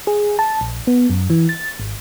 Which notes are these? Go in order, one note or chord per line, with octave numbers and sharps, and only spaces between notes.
G#4
A5
A#1
B3
F#2
E3
A6
G#1